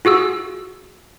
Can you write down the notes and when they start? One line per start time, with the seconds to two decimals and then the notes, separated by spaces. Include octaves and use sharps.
0.05 F4 F#4 G#4 E6